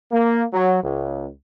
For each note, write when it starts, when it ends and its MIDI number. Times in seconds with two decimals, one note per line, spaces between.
0.12 0.44 58
0.53 0.82 54
0.83 1.28 37